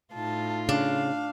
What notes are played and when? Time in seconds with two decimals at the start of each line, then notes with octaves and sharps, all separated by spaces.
0.14 A2 D#4 F4 A5
0.69 C#3 D4 F5